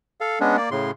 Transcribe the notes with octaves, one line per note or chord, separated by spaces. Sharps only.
A4 F5
G#3 B3 C#4 D4
A#3 D5
A2 C#3 C6